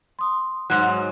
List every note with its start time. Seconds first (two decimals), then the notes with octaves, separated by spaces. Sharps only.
0.19 C6 D#6
0.70 G#2 F#3 F#6